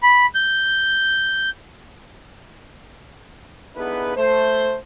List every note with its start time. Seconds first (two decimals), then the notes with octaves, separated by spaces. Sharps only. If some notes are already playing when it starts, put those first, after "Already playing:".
0.03 B5
0.35 G6
3.76 D3 B3 D#4 E4 G#4 B4
4.16 A3 C5